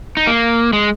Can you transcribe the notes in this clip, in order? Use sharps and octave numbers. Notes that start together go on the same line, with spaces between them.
D#4
A#3
G#3